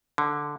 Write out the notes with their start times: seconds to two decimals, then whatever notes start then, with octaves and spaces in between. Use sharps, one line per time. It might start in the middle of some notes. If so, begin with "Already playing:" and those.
0.18 D3